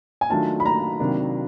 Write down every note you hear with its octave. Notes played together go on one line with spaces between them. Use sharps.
G#5
D#3 F#3 A3 D4 F4 A5
B5
A#5
C3 D#3 F#3 A#3 D4